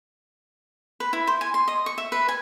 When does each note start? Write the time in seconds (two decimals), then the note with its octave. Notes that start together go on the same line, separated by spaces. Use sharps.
1.00 B4
1.13 E4
1.27 C5
1.41 G#5
1.54 C6
1.68 D#5
1.86 C#6
1.98 E5
2.12 B4
2.28 G#5